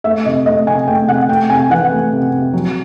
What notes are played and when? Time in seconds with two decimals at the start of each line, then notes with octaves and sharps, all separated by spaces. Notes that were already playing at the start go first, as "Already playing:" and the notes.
0.04 A3 E5
0.25 C3 D#5
0.46 A3 D#5
0.67 C3 G#5
0.87 A3 G5
1.08 C3 F#5
1.28 A3 G5
1.50 C3 G#5
1.70 E3 F#5
1.91 A3
2.12 C3
2.33 C3
2.53 F#3